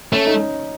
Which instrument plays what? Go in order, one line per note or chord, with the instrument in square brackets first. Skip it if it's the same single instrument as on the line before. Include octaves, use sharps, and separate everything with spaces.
[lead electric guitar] A3 [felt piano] C#4
[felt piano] D#4